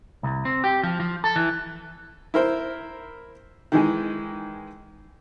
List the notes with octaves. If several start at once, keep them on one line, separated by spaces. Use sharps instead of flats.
C2
C4
G4
F3
F3
A4
E3
E4 A#4 C5
D#3 E3 G#3